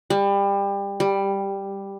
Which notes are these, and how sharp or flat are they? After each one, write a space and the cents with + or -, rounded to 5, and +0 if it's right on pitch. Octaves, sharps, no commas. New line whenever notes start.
G3 +25
G3 +5